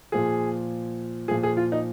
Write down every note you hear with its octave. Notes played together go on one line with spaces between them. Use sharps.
A#2 F3 G#4
A#2 F3 G#4
G#4
F4
D#4